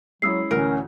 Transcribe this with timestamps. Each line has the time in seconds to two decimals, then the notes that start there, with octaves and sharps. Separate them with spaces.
0.22 F#3 G#3 C#4 E4 D#6 E6 C7
0.51 D2 A2 E3 C#4 A#4